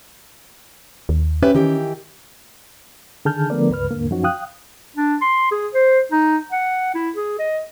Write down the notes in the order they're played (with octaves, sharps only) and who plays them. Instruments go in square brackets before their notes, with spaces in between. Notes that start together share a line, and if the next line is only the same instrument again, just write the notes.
[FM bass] D#2
[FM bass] C#4 [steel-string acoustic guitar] G4 B4 E5
[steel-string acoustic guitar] D#3 E3 G4
[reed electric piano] D3 D#3 G#4 A5 F6 G6
D3 F3 A3 B3 A#4 D5
C#2 G2 B4 F6
D#2 G#2 D3 A#3
F#2 F3 F#3 C#4 D#4 F#4
F5 G5 D#6 F#6
[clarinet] D4
C6
G#4
C5
D#4
F#5
E4
G#4
D#5